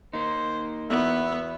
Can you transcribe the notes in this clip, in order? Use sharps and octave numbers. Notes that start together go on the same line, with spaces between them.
A#3 D#4 C5
E2 B3 F#4 E5